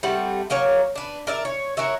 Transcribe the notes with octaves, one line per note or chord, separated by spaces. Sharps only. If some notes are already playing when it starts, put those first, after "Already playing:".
G3 A3 C4 F#5
F#3 A#3 A#4 C#5
D4 B4
A#4 D5 E5
C#5
F#4 A#4 C#5 E5